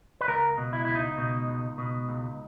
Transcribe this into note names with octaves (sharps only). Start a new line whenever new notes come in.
B4
C#2 A#4
B2
E4
C#2 E4
D#4
B2
C#2
B2
C#2